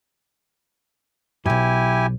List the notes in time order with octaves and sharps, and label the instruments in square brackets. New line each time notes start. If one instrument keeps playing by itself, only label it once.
[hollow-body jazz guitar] B1 F#2 [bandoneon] E4 G4 G#5